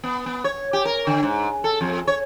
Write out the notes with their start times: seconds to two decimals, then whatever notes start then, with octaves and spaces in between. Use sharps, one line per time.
0.04 B3
0.26 B3
0.44 C#5
0.73 G4
0.85 A#4
1.07 D3
1.23 G#2
1.64 A4
1.81 F2
2.07 C#5